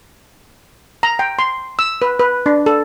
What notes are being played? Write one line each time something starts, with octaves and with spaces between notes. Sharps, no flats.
A#5
G5
C6
E6
B4
B4
D4
A4